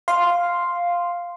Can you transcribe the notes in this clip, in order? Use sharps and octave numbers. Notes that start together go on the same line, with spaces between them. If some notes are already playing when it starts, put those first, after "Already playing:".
F5 C6